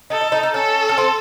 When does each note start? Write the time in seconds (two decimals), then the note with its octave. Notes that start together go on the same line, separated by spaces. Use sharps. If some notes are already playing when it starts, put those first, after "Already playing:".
0.10 D#4 A4
0.21 D#4
0.32 D#4
0.43 D#4
0.54 C#4 A4
0.89 C#4
0.98 C4